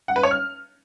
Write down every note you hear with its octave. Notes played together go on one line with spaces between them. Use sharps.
F#5
B4
C#5
F6